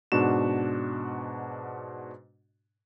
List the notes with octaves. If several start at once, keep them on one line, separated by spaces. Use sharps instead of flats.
G#2 B2 D4 F#4 E7